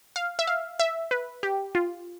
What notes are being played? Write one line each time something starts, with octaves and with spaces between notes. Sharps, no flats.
F5
E5
F5
E5
B4
G4
F4